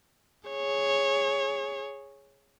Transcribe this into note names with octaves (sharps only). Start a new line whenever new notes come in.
G#4 C#5